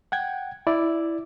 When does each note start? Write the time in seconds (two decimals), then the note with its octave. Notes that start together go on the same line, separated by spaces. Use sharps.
0.12 F#5 G5 G#6
0.67 E4 D5